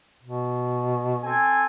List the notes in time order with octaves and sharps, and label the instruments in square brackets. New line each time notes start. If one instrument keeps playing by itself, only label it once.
[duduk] B2
[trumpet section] C4 A4 G#5